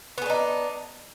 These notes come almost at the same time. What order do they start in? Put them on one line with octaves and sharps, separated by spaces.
B3 G#4 D4 D#4